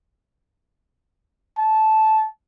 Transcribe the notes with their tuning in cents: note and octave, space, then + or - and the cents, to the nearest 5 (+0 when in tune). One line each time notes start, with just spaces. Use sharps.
A5 -15